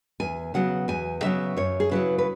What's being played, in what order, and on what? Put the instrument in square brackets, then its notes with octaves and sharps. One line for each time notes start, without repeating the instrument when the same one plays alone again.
[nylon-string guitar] E2 G#5
C#3 F#3 B3 F#5
E2 G#5
C#3 F#3 B3 E5
F#2 C#5
G#4
C#3 F#3 E4 B4
B4